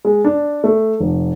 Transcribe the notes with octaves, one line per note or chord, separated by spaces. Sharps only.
G#3
D4
A3
F1